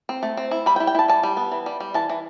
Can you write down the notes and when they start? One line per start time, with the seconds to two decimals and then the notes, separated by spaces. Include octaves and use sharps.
0.09 C4
0.23 A3
0.37 C4
0.51 E4
0.66 G3 B5
0.76 G5
0.80 E4
0.87 G5
0.95 E4 A5
1.08 G3 A5
1.23 G3
1.37 B3
1.52 E3
1.66 G3
1.80 G3
1.94 E3 A5
2.09 E3